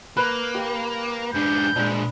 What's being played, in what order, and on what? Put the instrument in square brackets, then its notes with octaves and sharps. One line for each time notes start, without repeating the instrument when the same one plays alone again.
[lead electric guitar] A#3 [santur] B4
[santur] G4
[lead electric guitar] G#2 D4 [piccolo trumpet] G6
[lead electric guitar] A#2 G#3 [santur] D4